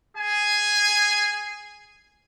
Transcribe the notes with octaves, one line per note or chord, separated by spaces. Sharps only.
G#4 G#5